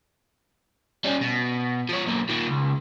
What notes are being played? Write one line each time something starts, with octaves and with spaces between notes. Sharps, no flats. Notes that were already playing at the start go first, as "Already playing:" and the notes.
G3 C#4
B2
F3 C#5
B1 A#3
A#2 D#3
C#2